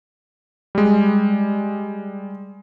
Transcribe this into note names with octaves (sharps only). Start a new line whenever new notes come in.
G3 G#3